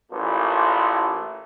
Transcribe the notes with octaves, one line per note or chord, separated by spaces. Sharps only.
A1 A#2 E4 A4